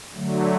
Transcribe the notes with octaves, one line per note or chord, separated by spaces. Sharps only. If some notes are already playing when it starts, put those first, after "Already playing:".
D3 F#3 A3